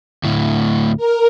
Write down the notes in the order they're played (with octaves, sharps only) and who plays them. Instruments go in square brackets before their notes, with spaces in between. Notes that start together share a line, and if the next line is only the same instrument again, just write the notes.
[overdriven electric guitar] D2 A2
[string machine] A#4